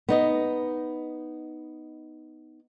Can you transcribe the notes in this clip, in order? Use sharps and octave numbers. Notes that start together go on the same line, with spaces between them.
B3 D#4 D#5